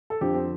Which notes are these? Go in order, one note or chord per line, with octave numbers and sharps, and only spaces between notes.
A4
F2 D3 F3 G4
C4